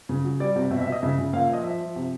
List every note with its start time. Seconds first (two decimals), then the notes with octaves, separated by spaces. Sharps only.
0.09 C#3
0.24 F#3
0.40 G3 D5
0.56 C3
0.70 B2 E5
0.81 E5
0.87 B2
0.92 D#5
1.02 C#3 E5
1.18 C#3
1.33 A#2 F5
1.44 E5
1.49 F3 D#5
1.64 F3 E5
1.80 F3
1.96 C3